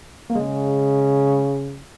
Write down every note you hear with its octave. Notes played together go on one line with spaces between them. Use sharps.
A#3
C#3 G#3